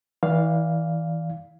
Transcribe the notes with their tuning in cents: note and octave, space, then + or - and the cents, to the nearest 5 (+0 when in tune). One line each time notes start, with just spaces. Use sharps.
E3 -30 D5 +0 F5 +0